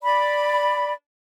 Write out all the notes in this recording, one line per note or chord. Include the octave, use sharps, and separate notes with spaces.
D5 B5